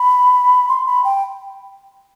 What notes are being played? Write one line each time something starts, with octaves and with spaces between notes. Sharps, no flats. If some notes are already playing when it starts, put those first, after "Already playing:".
Already playing: B5
C6
B5
G5